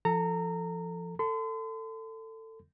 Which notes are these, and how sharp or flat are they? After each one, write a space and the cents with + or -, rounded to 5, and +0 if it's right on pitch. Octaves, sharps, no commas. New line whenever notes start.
F3 -25 A4 +10 A#5 -20
A4 +20 C6 -40